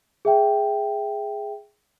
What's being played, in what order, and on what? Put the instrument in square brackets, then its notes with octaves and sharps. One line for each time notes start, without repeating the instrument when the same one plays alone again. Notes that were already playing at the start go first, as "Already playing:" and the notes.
[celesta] G#4 E5 G5